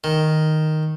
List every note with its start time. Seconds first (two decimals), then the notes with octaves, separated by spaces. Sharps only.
0.04 D#3